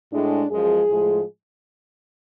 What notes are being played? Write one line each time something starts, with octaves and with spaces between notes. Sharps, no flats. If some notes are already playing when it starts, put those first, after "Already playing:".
A2 G#3 D4
F#2 F3 G#3 G#4
A2 F3 G#3